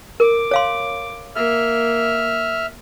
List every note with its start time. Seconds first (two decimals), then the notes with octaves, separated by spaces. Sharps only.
0.20 A#4 D6
0.51 C#5 F5 C6
1.36 A#3 E5 F6